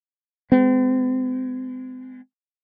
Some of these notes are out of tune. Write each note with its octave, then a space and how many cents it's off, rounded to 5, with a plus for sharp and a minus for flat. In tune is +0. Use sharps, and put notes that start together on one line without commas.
G#3 +0 C4 -40